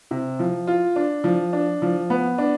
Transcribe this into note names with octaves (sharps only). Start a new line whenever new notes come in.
C3
F3
F4
D4
F3
D4
F3
B3
D4